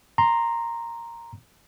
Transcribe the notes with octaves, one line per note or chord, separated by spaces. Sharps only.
A#5 C6